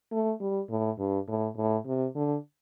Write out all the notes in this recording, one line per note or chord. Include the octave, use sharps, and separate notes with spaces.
A3
G3
A2
G2
A2
A2
C3
D3